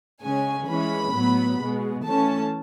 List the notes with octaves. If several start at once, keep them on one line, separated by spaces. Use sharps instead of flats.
C#3 G#3 C#4 G#5
E3 G#3 C#4 B5
A2 F#3 B3
B2 G#3 B3
E3 A3 C#4 A5